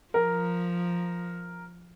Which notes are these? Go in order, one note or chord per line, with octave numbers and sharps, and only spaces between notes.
F3 A#4